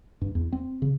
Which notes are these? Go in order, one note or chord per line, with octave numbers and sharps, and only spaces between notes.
G2
E2
C4
C#3